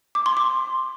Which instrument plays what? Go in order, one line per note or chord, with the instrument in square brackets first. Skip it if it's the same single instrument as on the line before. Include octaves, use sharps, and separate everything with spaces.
[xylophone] D6
C6
D6